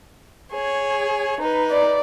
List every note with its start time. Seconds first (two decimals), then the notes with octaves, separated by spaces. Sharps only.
0.52 G#4 C#5
1.41 D#4 B4
1.71 D5